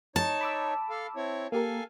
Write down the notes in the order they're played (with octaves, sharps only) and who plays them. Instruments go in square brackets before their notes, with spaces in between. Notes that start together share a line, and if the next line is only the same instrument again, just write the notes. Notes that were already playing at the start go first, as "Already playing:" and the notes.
[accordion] D#4 C#5 [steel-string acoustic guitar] A5
[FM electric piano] B5 D6 E6
[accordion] A4 F5
C4 E4 C#5
[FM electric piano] A#3 G4 A#4 [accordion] A4 F5 G#5